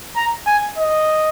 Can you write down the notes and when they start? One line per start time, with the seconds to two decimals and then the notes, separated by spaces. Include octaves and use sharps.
0.16 A#5
0.47 G#5
0.78 D#5